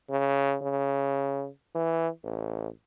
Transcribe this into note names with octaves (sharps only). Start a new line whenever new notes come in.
C#3
C#3
E3
A1